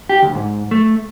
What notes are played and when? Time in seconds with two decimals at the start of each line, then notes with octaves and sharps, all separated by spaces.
0.09 G4
0.22 D2
0.35 G#2
0.71 A3